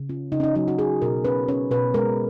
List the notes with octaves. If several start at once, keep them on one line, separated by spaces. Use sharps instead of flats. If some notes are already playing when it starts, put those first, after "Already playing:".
Already playing: C#3
C#4 F4
C#3 D#4
C#4
D#4
F#3 D#4
F#4
C#4 G#4
B2 A#4
C#4 B4
C#4 C#5
B2 B4
G#3 A#4